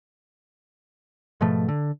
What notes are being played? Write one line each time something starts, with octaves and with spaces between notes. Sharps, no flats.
G#2 B2 F3 A3
D3